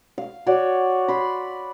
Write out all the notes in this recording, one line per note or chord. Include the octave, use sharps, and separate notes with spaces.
F5
F#4 C#5 D5
B5 C6